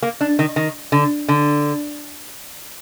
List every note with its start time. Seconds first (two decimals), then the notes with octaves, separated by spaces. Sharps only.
0.03 A#3
0.21 D4
0.39 D#3
0.56 D#3
0.92 D3
1.28 D3